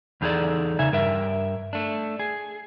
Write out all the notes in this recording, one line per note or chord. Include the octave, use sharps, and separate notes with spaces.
E2 E3 D#4 G#4 A4 D5
C#3 D#4 E5 G#5
G2 A#4 E5
A3 D4
G#4